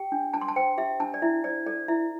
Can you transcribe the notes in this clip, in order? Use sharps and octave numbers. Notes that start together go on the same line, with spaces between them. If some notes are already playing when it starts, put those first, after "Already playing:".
Already playing: G4 G5
D4
D4 A5
C6
A5
C5 G5
G4 E5
D4 A5
D5
E4 E5
C5 D5
A4 D5
E4 E5